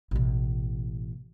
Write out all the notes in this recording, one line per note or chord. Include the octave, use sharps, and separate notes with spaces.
A1 B2